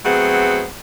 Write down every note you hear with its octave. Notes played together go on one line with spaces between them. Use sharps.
F#3 A3 B3 C4 G#4